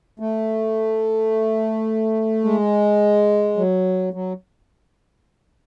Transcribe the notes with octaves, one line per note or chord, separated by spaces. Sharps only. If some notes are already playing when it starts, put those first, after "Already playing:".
A3
G#3
F#3
F#3